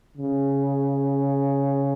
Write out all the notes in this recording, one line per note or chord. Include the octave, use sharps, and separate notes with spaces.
C#3